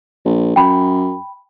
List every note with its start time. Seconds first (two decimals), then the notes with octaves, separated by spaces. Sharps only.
0.25 A#1
0.56 F#2 G5 B5